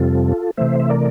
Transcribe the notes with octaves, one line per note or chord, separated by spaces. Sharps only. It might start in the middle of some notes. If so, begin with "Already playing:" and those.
Already playing: F2 C3 G3 C4 F4 A4
C3 E3 A3 C5 E5
E5
A#4 D5